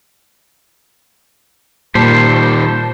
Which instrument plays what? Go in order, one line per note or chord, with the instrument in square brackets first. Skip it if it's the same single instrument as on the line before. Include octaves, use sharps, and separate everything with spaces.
[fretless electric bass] A#2 [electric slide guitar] D#3 G3 [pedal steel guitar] C5 [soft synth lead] A5